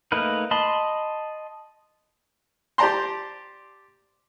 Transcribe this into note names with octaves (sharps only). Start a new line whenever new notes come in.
A3 A#3 D#4 A#4 B4
D#5 A5 B5 C6
G4 C5 D5 A5 A#5 C6